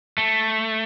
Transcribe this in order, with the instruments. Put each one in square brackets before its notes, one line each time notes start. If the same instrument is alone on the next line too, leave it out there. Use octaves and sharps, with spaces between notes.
[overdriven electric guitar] A3